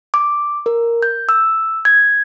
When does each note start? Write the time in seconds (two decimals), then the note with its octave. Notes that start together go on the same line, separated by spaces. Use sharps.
0.14 D6
0.66 A#4
1.03 G6
1.29 E6
1.85 G#6